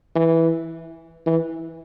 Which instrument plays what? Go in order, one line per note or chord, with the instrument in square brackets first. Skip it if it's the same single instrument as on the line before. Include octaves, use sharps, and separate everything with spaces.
[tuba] E3
E3